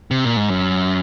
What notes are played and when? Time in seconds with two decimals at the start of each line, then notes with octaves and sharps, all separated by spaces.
0.11 C3
0.24 A#2
0.37 G#2
0.50 F#2